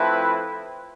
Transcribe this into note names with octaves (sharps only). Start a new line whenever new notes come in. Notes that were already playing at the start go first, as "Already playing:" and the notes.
Already playing: F3 A3 C4 E4 B4